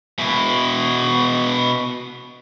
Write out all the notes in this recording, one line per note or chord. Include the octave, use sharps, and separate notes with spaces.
B2 E4